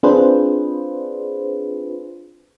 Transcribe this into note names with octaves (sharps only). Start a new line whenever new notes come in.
C4 D4 F4 G#4 B4 C5